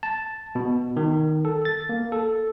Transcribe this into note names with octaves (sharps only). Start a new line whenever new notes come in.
A5
B2
D#3
A4
A6
A#3
A4